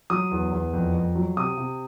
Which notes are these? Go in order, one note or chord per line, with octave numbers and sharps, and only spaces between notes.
F#3 D#6
E2
E2
F2
F2
F#3
C3 D#6
C3